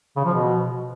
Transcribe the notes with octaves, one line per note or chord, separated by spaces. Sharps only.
C#3
F3
B2